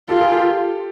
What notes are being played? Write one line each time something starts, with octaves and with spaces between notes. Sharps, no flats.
F4 G4 A4
G#4 A#4
G4 A4